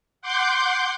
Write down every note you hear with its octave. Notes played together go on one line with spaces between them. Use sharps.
F#5 C6 D6 G6